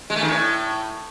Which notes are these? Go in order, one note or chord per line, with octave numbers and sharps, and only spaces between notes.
G#3
A3
D#3
A2